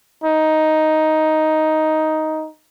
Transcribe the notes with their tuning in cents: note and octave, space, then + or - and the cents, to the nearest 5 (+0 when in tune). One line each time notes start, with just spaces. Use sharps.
D#4 +5